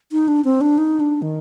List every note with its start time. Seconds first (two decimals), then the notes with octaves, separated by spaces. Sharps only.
0.12 D#4
0.28 D4
0.45 C4
0.61 D4
0.78 D#4
1.00 D4
1.22 D#3